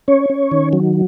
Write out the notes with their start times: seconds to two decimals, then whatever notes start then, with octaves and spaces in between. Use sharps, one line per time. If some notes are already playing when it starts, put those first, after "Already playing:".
0.08 C#4 C#5
0.30 C#4
0.51 D#3
0.73 F#3